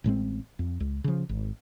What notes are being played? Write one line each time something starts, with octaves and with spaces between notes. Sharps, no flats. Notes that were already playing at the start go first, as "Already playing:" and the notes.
A1 A2 G#3 C4
F2
C#2
C#3 F3
G#1